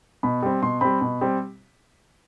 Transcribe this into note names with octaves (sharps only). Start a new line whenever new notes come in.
B2 B5
G3 C4
B2 C6
G3 C4 B5
B2
G3 C4